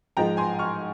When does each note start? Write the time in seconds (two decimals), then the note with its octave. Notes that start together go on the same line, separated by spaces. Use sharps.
0.17 G#2 F3 G#3 G5 A#5
0.37 G#5 C6
0.59 C#6 F6